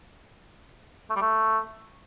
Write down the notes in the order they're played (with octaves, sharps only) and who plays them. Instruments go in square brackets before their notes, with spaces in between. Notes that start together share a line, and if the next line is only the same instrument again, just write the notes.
[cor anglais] A3
G3
A3